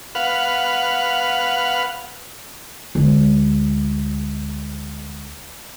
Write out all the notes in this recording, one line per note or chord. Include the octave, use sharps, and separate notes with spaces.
B4 F5 F#5
D2 G#3